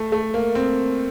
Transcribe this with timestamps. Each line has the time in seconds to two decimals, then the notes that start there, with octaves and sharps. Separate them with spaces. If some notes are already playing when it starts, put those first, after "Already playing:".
Already playing: A3
0.12 A3
0.34 A#3
0.55 C4